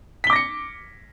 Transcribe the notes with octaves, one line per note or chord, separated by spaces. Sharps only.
D6 A#6 B6 C#7 G7